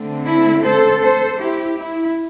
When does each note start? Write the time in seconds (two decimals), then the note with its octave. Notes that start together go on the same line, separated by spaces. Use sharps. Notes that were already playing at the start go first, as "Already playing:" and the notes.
Already playing: D3 A3 C4
0.26 E4
0.64 A4 C5
1.02 A4 C5
1.40 E4 G4
1.79 E4